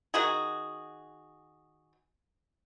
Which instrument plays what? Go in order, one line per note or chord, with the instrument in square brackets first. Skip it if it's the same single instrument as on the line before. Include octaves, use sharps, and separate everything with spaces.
[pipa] D#3 F#4 G#4